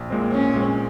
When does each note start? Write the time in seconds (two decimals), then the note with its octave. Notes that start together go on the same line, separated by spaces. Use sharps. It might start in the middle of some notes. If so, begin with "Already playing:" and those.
Already playing: A#1
0.10 A#2 G#3 C4
0.32 A#1 C#4
0.53 A#2 G#3 C4